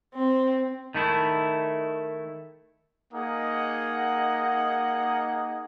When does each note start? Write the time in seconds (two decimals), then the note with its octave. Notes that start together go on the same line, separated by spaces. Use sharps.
0.15 C4
0.94 D#3 A3 E4
3.14 A#3 D#4 G#4 D#5 F#5